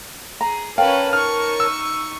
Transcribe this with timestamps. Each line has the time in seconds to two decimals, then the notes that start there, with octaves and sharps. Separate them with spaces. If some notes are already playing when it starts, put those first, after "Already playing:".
0.41 G#4 A#5
0.78 C#4 A#4 B4 C#5 F5 G5 A5
1.13 D#4 C#6 F6
1.60 E6